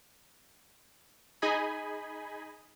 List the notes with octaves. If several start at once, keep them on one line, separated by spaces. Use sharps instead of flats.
D#4 G#4 D#5 G#5 B5